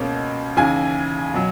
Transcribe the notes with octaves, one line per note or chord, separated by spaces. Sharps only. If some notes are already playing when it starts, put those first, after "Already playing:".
Already playing: C#2 B2 A#3 C#4
D#2 C#3 E3 G#5
B2 F#3